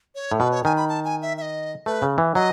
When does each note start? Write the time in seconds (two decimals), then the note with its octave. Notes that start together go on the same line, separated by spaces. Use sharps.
0.15 C#5
0.32 A2
0.40 B2 B4
0.51 C#5
0.64 D#3 G#5
0.77 B5
0.88 A5
1.04 G#5
1.22 E5
1.37 E5
1.42 D#5
1.86 A3 B4
2.02 C#3
2.18 E3
2.35 F#3 D#5